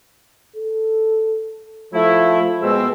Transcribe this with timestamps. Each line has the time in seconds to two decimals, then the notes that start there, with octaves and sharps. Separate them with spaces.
0.56 A4
1.94 F3 A3 E4
2.62 B2 G#3 C4 E6